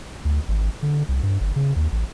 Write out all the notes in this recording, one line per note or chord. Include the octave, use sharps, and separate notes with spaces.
D2
G#1
D3
C2
G2
G1
C#3
D#2
A1